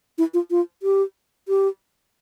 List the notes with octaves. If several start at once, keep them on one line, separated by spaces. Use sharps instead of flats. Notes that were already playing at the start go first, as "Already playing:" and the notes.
E4
F4
F4
G4
G4